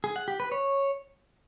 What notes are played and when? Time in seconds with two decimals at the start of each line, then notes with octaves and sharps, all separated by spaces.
0.04 G#4
0.16 F#5
0.28 G4
0.40 B4
0.52 C#5